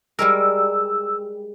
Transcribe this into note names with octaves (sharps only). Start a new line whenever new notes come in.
G3 G#3 A#4 E6